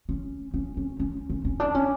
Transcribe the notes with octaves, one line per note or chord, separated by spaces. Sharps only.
C#4
C#4
C#4
C#4
C#4
C#4
D4
C#4